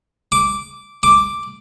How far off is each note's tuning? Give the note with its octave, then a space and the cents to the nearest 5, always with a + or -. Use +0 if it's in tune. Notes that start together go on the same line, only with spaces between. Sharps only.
D6 -10
D6 +0